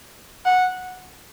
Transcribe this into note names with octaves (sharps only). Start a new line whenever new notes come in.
F#5